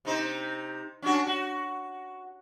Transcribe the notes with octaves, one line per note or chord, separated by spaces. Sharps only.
C3 D#4 C5
C#4 D4 F#4
F#4